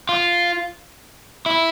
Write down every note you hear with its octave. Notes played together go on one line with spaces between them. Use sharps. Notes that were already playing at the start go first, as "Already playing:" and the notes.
F4
E4